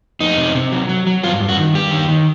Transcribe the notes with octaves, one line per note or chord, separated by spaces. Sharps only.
F2 D#4
C3
C3
F#3
F#3
F#3
G2 F4
G2
F#4
D#3
G2 G4
D#3
D#3